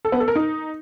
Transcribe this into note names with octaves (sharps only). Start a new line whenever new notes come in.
A4
B3
A4
A#4
D#4